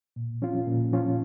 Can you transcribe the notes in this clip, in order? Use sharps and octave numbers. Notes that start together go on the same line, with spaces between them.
A#2
F3 C#4 F4
A#2
F3 C#4 F4